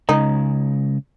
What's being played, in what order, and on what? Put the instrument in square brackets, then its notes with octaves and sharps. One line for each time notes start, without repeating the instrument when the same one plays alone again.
[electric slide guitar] C#3 G#3 [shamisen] D#4